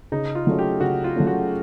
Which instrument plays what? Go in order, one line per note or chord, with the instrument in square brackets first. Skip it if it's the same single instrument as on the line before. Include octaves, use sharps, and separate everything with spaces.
[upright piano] C#3 [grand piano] D#4
[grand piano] F4
[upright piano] F#3 A3 C#4
[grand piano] G4
[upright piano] C#3 [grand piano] F#4
[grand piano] F4
[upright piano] F#3 A3 C#4
[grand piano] F#4